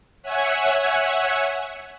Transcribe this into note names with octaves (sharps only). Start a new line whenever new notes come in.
C#5 E5 F#5 G#5